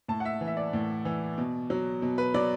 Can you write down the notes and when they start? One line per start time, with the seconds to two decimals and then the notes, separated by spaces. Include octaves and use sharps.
0.08 A2 A5
0.20 F#5
0.25 E5
0.41 E3
0.47 E5
0.57 D5
0.73 A2
1.05 E3
1.38 B2
1.70 F#3
2.02 B2
2.18 B4
2.34 F#3 D5